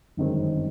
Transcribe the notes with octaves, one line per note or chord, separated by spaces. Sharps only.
G1 F#2 D#3 G#3 C4